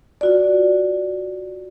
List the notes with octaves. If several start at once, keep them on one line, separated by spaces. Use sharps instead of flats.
F4 F#4 D5